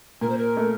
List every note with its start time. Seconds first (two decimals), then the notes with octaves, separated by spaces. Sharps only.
0.21 A#2 A#4
0.29 C5
0.38 A#4
0.57 A3